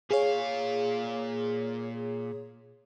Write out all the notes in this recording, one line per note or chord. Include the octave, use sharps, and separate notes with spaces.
A#2 G#4 C#5 F5